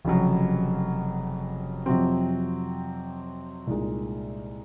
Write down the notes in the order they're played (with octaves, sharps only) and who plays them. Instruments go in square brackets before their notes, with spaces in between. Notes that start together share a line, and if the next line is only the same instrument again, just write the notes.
[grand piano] F1 F2 C#3 F#3
F2 C3 F#3 C4
C2 A#2 G#3 D#4